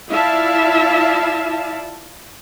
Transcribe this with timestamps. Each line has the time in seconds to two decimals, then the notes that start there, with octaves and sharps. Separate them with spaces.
0.10 E4 F4 D5 E5 F5 A5